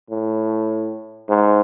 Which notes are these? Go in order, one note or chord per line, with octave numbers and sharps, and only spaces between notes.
A2
G#2